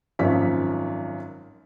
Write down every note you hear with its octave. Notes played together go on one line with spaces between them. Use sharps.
G#1 F#2 F3 B6